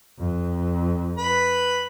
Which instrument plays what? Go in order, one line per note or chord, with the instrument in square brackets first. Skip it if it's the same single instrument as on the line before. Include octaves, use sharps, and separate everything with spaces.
[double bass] F2
[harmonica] B4 B5